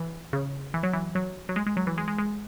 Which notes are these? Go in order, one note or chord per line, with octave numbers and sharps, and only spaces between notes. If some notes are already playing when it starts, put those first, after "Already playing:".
Already playing: E3
C#3
E3
F#3
E3
F#3
F#3
G#3
G#3
F#3
E3
G#3
G#3
G#3